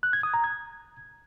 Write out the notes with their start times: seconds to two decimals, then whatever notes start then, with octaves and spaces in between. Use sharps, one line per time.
0.03 F#6
0.13 G#6
0.23 D#6
0.34 A#5
0.44 G#6